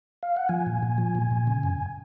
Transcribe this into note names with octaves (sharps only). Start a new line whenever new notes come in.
F5
F#5
F3 G#5
A#2
A#2
F3
A#2
A#2
C#3
F#2